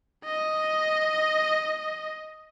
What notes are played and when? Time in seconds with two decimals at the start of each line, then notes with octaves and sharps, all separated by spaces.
0.24 D#5